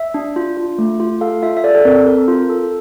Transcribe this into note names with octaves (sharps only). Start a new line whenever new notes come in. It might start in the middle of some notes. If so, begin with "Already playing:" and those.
Already playing: E5
D4
F4
F4
A3
F4
A4 F5
F4 E5
E5
A4 D5
A4
C4 A#4
A4
C4 A#4
F4
A4